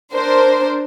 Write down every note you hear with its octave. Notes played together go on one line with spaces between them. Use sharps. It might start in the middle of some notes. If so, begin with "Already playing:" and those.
D4 A#4 C5